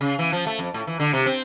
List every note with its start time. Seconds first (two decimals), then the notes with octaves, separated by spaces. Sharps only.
0.01 C#3
0.19 E3
0.32 F3
0.47 A3
0.59 F2
0.74 A2
0.87 E3
1.00 D3
1.13 C3
1.26 C4